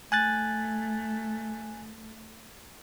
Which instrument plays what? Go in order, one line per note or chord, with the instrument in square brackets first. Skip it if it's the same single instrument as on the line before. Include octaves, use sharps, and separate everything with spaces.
[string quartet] A3 [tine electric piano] G#5 F#6 A6